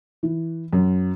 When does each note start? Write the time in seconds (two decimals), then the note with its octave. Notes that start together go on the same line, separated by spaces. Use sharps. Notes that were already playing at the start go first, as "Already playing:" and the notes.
0.23 E3
0.73 F#2